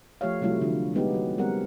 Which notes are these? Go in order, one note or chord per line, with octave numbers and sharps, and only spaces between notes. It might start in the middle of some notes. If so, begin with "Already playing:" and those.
F3 A3 G4 C#5 F5
C3 F#3 G3 A3 E4 F4
D3 F3
G3 G#3 B3 D#4 G4
F#3
G3 G#3 B3 C4 A#4 F#5